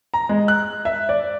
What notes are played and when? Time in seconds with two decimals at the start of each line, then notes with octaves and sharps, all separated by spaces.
0.14 A#5
0.29 G#3
0.48 F#6
0.85 E5
1.09 D5